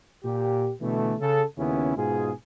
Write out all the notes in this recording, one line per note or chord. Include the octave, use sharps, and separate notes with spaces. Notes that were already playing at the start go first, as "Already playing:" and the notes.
A#2 G4
B2 D3 E3 A3
C#3 A4
D#2 C#3 B3 C#4 E4
G#2 B2 F4 G#4